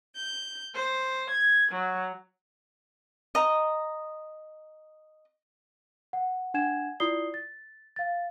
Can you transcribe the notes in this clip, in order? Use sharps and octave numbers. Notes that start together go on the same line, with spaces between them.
G6
C5
G#6
F#3
D#5 A#5
F#5
D4 F#5 G#5 G#6 E7
E4 F4 D5 D#6 C7 G7
A6
F5 A6